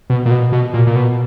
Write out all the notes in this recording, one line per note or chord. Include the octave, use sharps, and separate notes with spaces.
B2
A#2
B2
B2
A#2
A#2
B2